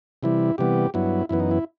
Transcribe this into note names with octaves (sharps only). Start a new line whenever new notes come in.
C3 E3 G3 E4
C3 E3 G3 B3 G4
G2 F#3 B3 E4
F#2 E3 B3 E4
D#4
E4